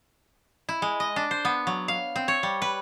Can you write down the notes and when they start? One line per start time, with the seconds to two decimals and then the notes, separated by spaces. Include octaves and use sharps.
0.69 E4
0.82 G#3
1.00 D#5
1.16 D4
1.31 C5
1.45 B3
1.67 F#3
1.88 F5
2.16 C4
2.28 C#5
2.43 G3
2.62 B4